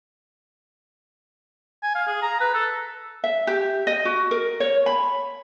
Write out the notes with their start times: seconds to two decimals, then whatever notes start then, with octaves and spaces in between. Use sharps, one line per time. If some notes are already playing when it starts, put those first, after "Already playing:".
1.83 G#5
1.95 F5
2.07 G#4
2.22 A#5
2.40 B4
2.54 A4
3.24 E5
3.47 G4
3.87 D#5
4.05 F#4
4.31 A#4
4.60 C#5
4.86 B5